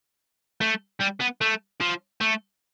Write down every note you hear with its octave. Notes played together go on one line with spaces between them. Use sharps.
A3
G3
B3
A3
F3
A3